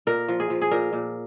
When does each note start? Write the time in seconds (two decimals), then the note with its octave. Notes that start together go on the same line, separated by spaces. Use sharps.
0.07 A#2 A#4
0.28 F3
0.40 G#4
0.50 F3
0.61 G#4
0.71 A#2 A#4
0.93 A#2